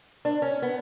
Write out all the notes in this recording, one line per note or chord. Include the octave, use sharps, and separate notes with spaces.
D4
C#4
B3